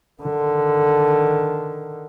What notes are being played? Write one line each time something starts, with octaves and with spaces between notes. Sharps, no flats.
D3 D#3